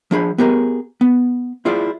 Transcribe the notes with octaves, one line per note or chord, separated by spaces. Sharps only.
F3 D4 G#4 B5
B3 G4 G#4 A#4
B3
E4 F4 G#4 D5